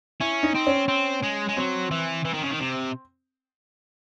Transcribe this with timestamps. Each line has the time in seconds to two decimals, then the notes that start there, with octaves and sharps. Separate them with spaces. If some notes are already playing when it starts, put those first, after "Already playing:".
0.20 C#4 E4
0.43 D#4
0.55 C4
0.67 C#4
0.88 C4
1.23 G#3
1.48 G#3
1.56 F#3 C4
1.91 E3
2.25 E3
2.34 D#3
2.42 C#3
2.51 D#3
2.59 C3